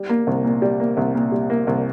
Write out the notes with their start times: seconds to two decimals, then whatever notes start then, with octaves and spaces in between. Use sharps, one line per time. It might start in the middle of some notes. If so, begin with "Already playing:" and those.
Already playing: G3
0.09 A#3
0.27 C2
0.44 A#2
0.62 G3
0.80 A#3
0.97 C2
1.15 A#2
1.32 G3
1.50 A#3
1.67 C2